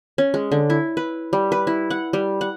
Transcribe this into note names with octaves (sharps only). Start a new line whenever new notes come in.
C#4
G#3
D3
E4
B4
G3
B4
E4
F#5
G3
F#5